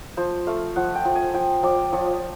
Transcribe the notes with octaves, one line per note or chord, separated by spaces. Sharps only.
F3 C5
A3 F5
F3 F#5
G5
F3
G#5
F3 G5
F3 D5
F3 C#5